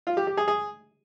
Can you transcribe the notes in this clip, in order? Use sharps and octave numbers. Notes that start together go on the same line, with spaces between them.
F4
G4
G4
G#4
G#4